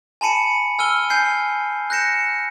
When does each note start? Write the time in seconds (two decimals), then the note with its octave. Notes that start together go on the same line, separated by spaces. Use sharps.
0.21 G#5 A5 B5 C#7 D#7
0.79 G#5 E6 F6 D#7 G7
1.10 G#5 G6 C7
1.90 F#6 G6 A#6 C#7 E7